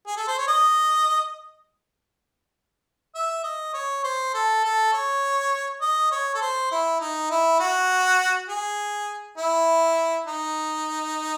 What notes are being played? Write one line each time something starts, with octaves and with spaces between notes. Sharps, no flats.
G#4
A4
C5
C#5
D#5
E5
D#5
C#5
C5
A4
A4
C#5
D#5
C#5
A4
C5
E4
D#4
E4
F#4
G#4
E4
D#4